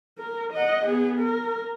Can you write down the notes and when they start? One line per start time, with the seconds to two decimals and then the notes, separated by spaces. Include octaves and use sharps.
0.18 A#4
0.53 D#5 F#5
0.85 B3 G#4
1.19 A#4